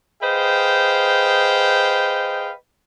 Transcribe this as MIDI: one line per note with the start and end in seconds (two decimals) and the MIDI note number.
0.21 2.53 68
0.21 2.53 71
0.21 2.53 72
0.21 2.53 75
0.21 2.53 77
0.21 2.53 79